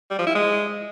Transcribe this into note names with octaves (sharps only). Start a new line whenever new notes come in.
G3
F3
E4
G#3